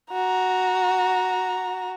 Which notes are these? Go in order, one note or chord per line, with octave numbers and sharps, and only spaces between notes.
F#4 A#5